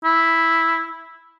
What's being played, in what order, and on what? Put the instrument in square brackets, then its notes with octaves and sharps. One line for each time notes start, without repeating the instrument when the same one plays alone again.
[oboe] E4